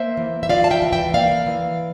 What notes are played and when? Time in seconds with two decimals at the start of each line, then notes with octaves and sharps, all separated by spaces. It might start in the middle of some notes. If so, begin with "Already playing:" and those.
Already playing: A#3 C5 E5
0.17 E3
0.43 E5
0.49 F4 D5 F5
0.64 A5
0.71 E5 G5
0.82 E3
0.93 E5 G5
1.14 A#3 D5 F5
1.46 E3